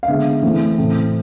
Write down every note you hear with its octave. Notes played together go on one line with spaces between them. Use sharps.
F5
D3 G#3 B3 E5
E3 A3 C4
A2 E3 A3 C4